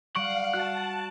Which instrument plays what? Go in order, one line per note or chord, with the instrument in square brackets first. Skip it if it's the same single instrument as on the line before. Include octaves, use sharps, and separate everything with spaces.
[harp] G3 [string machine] F5 [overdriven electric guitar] F#5 [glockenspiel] C#6 D7 F#7
[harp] F#4 [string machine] A5 [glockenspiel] F#6